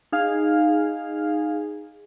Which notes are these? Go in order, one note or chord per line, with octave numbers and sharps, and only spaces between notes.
D#4 G#4 F5 F6